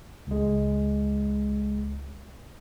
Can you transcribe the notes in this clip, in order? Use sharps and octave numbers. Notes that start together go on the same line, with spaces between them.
C#2 G#3